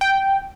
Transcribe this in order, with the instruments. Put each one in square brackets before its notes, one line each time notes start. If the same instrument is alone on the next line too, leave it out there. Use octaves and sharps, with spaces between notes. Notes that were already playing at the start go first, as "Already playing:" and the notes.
[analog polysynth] G5